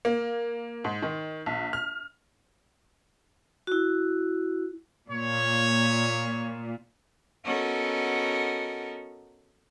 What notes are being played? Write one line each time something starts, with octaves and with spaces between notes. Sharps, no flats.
A#3
G#2
D#3
A#1
F6
E4 F#4
A#2 C#5
B3 C#4 F#4 A4 A#4 D#5